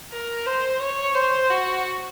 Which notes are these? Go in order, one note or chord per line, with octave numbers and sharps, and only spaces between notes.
A#4
C5
C#5
C5
F#4